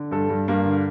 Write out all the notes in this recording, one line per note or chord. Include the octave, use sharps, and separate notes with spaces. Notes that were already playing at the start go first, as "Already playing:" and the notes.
Already playing: D3
G2 A4
G2
G2 A#3
D3